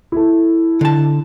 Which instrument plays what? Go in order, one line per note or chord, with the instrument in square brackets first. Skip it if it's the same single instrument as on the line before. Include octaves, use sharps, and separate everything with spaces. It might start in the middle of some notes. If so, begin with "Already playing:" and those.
[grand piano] E4 A4
[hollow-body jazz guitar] D3 A5